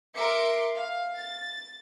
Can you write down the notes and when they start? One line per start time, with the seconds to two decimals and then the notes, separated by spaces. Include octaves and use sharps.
0.17 A#4 E5 C6 D6 C#7
0.75 F5
1.17 A6